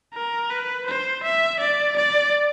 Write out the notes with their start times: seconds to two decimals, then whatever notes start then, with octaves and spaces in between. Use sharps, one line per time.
0.14 A#4
0.50 B4
0.87 C5
1.24 E5
1.60 D5
1.97 D5